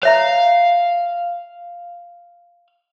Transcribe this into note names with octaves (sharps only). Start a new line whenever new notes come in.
C#5 E5 F5 A#5